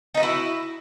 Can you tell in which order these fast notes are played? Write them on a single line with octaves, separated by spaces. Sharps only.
D#4 B4 F#4 E4